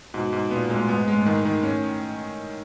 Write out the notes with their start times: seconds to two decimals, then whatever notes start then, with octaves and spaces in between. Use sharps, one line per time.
0.14 G#2 B2
0.33 G#2
0.51 A#2 B3
0.70 A2 G#3
0.89 G#2 B3
1.07 A2 G#3
1.22 A2
1.26 G#2 D#3
1.45 D#3
1.63 A2 C#4